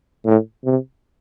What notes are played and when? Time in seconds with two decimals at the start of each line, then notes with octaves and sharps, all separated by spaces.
0.25 A2
0.65 C3